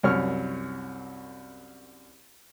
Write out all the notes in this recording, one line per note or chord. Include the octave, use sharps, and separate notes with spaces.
C2 F#2 C#5 C#6 F6